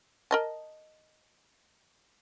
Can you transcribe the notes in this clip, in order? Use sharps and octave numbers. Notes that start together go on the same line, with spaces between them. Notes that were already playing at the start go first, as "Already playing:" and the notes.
A#4 D#5 A5